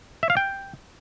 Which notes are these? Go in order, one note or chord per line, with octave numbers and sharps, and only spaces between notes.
E5
F5
G5